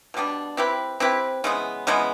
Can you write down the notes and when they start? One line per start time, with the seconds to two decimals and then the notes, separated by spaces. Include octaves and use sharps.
0.14 B2 G3 B3 D4
0.57 C4 E4 G4 B4
1.00 C4 E4 G4 B4
1.44 C#3 E3 G#3 B3
1.87 C#3 E3 G#3 B3